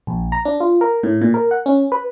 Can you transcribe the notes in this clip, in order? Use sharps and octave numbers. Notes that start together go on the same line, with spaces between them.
A#1
A#5
D4
F4
A#4
A2
A#2
A#4
F#5
C#4
B4